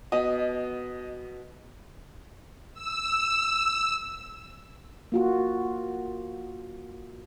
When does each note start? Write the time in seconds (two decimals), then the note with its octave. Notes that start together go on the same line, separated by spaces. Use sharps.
0.12 B2 D#5
2.74 E6
5.12 A#3 F4 F#4